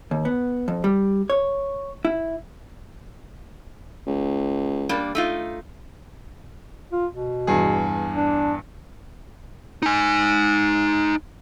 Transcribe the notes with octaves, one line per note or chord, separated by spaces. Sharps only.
D#2
B3
F2
G3
C#5
E4
C#2
G3 A#3 D4
A3 D#4 F4
F4
B2
E2 G2 G#4
D4
D#4 G#5